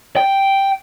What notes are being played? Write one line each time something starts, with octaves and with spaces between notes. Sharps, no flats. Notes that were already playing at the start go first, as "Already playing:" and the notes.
G5